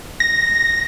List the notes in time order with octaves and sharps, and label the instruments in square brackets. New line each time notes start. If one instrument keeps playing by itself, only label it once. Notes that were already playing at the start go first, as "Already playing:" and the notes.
[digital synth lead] A#6